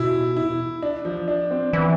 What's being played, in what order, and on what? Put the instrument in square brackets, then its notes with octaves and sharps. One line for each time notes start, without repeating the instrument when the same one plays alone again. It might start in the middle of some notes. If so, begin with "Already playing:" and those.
Already playing: [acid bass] B2 [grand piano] E4
[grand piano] E4
D4
F3
D4
C4
[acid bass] E3 [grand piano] B3